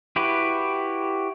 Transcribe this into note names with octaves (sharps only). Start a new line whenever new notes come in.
E4 F#4 G4 B4